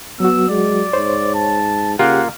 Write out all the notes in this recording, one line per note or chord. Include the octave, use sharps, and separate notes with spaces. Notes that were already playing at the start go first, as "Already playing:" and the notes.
F#3 B3 F#4 E6
G#3 D5
G#2 C5 C#5
A5
C#3 A#3 F4 G4 F#5